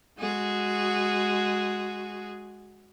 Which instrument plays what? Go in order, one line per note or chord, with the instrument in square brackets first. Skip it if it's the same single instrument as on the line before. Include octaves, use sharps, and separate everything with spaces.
[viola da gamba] G#3 F#4 G#4